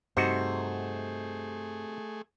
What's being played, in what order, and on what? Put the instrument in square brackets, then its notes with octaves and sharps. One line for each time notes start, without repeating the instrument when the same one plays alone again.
[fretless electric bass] G2 [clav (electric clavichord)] C3 D#4 F#4 [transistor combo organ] A3 G#4 [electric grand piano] C5